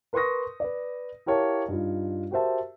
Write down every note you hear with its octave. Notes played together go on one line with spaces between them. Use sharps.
A#4 B4 C6 C#6 D#6 A#6
B4 D5
E4 G4 A#4 C#5 F5 A5
G2 D#4 F4
F#4 G4 A#4 C5 E5 A5